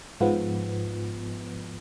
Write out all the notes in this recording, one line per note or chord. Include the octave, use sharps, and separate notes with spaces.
G#2 F3 B3